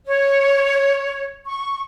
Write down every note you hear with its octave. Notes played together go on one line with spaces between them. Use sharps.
C#5
C#6